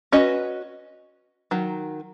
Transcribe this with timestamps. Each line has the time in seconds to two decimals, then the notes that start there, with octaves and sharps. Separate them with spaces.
0.12 C#4 F#4 B4 D#5
1.51 D#3 F#3